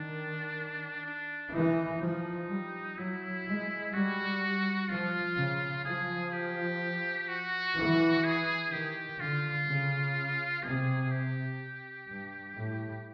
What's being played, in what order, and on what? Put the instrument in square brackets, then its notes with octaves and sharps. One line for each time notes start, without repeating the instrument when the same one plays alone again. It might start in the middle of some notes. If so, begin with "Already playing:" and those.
Already playing: [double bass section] D#3 [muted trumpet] D4
[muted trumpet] D4
[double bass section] E3 [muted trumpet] D#4
[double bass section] F3 [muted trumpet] D#4
[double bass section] G3
[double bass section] F#3 [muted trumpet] E4
[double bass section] G#3
[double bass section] G3 [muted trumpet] F#4
[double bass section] F3 [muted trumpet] F4
[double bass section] C#3
[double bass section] F3 [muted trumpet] G#4
[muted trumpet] G4
F#4
[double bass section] E3
[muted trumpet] G#4
[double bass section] D#3 [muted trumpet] G4
[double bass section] D3 [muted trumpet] F4
[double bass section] C#3
[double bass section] C3 [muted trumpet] G#4
[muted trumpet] G4
[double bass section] G2
A2